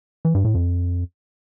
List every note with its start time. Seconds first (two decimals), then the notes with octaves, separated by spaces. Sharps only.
0.25 E3
0.35 G2
0.44 A2
0.54 F2